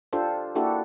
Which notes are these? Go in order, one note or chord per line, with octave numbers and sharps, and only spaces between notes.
D4 F4 G4 A4 C5
A#3 D4 E4 F#4 G4 A4